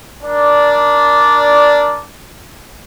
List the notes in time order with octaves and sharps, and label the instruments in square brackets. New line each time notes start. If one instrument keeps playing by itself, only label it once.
[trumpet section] D4 A#4 D5